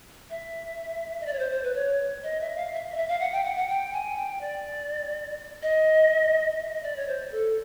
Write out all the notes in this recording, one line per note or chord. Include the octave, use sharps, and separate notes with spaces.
E5
D#5
D5
C#5
C5
C5
B4
C#5
D#5
E5
F5
E5
D#5
E5
F5
F#5
G5
F#5
F#5
G5
G#5
G5
D5
D#5
E5
D#5
D5
C#5
C5
A4